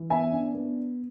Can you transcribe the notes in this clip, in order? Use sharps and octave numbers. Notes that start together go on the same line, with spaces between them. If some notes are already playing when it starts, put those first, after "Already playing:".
Already playing: E3
B3 E5 G#5
D4
B3